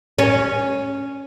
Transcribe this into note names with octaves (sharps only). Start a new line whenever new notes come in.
C#4